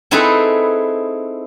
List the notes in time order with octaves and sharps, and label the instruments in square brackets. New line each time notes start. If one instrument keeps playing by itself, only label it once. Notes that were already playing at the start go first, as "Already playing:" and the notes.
[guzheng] C4 D#4 E4 G#4 A4 B4